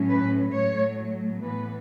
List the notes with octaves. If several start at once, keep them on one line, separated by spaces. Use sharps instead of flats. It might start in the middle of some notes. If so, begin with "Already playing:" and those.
Already playing: A2 F#3 C#4
B4
A2 F#3 A3 C#5
A2 E3 B3 B4